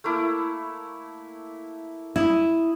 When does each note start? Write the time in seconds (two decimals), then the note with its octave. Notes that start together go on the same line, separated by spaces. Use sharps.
0.04 A3 A#3 E4
2.16 E4 D#6